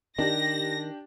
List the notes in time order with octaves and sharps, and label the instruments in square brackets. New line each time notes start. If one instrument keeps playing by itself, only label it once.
[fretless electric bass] D#3 [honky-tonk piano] D4 G4 [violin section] A#6